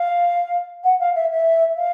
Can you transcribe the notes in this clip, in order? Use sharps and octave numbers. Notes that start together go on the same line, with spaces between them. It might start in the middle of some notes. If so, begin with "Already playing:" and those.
Already playing: F5
F#5
F5
E5
E5
F5